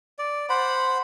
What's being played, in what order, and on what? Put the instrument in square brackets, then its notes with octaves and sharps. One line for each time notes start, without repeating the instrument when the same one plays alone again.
[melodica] D5
C5 F#5 B5